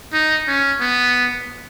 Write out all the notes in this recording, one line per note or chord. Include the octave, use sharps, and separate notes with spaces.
D#4
C#4
B3